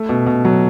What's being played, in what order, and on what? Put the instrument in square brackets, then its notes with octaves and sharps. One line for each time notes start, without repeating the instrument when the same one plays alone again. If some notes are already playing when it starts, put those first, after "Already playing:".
Already playing: [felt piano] A3
B2
B2
F#3